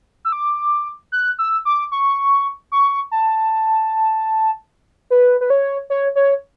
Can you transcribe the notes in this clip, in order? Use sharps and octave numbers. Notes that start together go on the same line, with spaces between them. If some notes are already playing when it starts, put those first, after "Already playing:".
E6
D6
F#6
E6
D6
C#6
C#6
A5
B4
B4
C#5
C#5
C#5